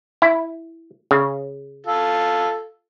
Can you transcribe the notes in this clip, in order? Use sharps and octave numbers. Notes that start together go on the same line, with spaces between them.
E4
C#3
F4 A4